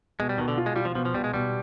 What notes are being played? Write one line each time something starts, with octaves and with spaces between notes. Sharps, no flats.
B2 G#3
G3
B2 D#3
D3
F4
G#3
G3 F4
F3
B2 F3
F3
B2 G3
G#3
B2 G3